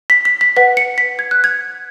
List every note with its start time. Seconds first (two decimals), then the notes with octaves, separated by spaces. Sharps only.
0.10 B6
0.25 B6
0.41 B6
0.57 B4 F#5 B6
0.77 C#7
0.98 B6
1.19 G#6
1.31 F#6
1.44 G#6